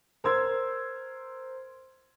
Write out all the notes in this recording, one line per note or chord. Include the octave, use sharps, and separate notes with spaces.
A#4 C5 C6 E6 G#6